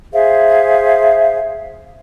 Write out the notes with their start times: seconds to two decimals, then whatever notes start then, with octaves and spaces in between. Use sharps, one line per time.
0.13 G#4 C5 E5 F5